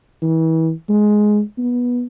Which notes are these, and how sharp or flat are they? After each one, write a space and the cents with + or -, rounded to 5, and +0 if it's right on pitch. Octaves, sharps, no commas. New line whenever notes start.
E3 -35
G#3 +10
B3 -15